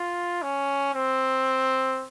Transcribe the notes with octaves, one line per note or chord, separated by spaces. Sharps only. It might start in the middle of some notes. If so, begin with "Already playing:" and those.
Already playing: F4
C#4
C4